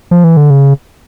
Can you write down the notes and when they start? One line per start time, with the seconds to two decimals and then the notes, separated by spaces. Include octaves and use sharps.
0.11 F3
0.24 E3
0.37 D3
0.50 C#3